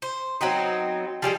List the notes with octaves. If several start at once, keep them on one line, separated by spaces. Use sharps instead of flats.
C5
F#3 B3 C4 D#4
F3 G3 G#4 D#5